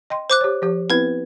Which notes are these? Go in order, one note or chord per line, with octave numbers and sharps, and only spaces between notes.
D#5 G5 C6
C5 D6 F#6
G4 C#5
F3 G4
B3 C4 E4 B4 G#6